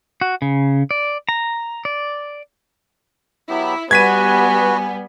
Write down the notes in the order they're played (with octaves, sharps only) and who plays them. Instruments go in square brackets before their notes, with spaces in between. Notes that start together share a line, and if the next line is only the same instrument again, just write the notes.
[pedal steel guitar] F#4
C#3
D5
A#5
D5
[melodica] F#3 B3 G4 [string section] E4
[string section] G3 B3 [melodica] F#4 B4 [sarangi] G#5 [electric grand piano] G#6 B6 D#7